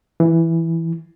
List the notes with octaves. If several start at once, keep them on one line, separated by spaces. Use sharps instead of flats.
E3